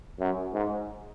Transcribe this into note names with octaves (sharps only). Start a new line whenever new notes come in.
F#2
G#2